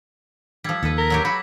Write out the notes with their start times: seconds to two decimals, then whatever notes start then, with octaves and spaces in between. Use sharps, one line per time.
0.64 F3 G3 E6 G#6 B6
0.83 D#2 A4 B4
0.98 A#4 A#6 B6
1.10 F#3 F#4 G4
1.25 F#4 B5 D6 B6